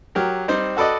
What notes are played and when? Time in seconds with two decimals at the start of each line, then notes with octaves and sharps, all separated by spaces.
0.15 F#3 G4 A#4
0.48 G3 C4 D#4 C5
0.77 F#4 A4 B4 D5 D#5